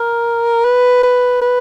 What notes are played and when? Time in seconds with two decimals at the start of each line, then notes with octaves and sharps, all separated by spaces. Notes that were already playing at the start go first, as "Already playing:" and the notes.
Already playing: A#4
0.65 B4
1.03 B4
1.42 B4